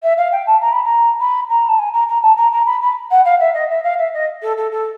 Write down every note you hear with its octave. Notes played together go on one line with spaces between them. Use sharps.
E5
F5
G5
A5
A#5
B5
A#5
B5
A#5
A5
G#5
A#5
A#5
A5
A#5
A#5
B5
B5
F#5
F5
E5
D#5
E5
F5
E5
D#5
A4
A4
A4